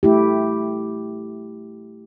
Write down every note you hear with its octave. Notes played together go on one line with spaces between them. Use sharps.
A3 E4 G4